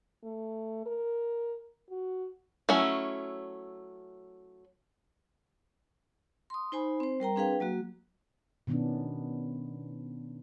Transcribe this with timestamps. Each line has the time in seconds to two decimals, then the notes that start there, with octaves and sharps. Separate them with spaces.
0.24 A3
0.86 A#4
1.90 F#4
2.69 F#3 A3 C#4 E4
6.50 C6 D#6
6.72 D#4 C5 G#5 B5
7.00 C4 C5
7.20 G3 A#4 G5 A#5
7.36 C4 D4 G#4 B4 F5 G5
7.60 F#3 A#3 F#4
8.67 B2 D#3 B3 C#4 D4